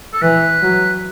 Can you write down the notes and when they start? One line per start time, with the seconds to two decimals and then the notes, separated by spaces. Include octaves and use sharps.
0.13 A4
0.22 E3 B4
0.63 F#3